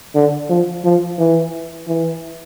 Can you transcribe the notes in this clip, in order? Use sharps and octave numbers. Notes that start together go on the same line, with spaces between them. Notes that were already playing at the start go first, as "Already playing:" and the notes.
D3
F3
F3
E3
E3